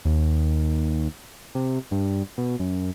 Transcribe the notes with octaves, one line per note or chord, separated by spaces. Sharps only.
D#2
C3
G2
B2
F#2